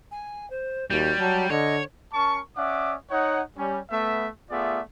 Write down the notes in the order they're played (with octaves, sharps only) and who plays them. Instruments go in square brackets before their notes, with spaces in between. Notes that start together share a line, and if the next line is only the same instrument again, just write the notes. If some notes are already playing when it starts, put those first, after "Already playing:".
[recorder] G#5
C5
[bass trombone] D#2 [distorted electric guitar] G3 [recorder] F#4
[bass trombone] F#3 [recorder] A5
[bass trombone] D3 [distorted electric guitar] C#5 [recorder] D#5
[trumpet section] C#4 A#4 A5 C#6
C#4 D5 E5 F#5 D6 D#6
D#4 C#5 F#5
G3 C#4
A3 B3 E5
A3 B3 F4 G#4 D5 E5